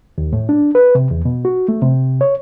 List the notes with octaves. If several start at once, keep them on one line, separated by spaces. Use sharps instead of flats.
D#2
A2
D4
B4
C3
E2
B2
F#4
A3
C3
C#5